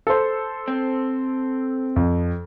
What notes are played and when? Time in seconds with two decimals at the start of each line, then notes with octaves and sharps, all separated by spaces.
0.07 A4 C5
0.68 C4
1.96 F2